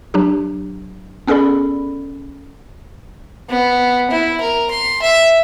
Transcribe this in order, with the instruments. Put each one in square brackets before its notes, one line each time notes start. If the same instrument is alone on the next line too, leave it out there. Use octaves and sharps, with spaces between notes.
[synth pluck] F#3 D4 G4
B3 C#4 G#4 A4 D5 B5
[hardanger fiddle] B3
E4
A#4
C6
E5